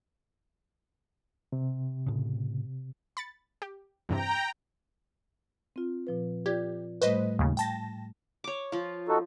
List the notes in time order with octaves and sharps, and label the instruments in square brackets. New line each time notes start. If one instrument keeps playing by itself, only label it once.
[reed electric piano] C3
[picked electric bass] A2 C#3
[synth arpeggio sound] B5 A6 C#7
G4
[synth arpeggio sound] E2 G2 C3 [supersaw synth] G5 A#5
[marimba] C4 F4
A#2 F3 B4
[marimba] F4 D5 G#6 [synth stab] G4
[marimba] A2 G3 A3 [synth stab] B4 C5 D#5
[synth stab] D#2 C#3
G5 A5 A#6
[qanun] C#5 D6
F3 F4
[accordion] D#4 F#4 A4